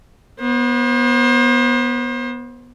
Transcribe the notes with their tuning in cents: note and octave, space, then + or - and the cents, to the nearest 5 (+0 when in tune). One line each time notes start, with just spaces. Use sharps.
B3 -20 C5 +30